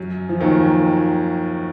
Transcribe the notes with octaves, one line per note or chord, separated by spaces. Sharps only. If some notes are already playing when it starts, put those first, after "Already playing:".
Already playing: F#2 F#3
F3
D#2 D#3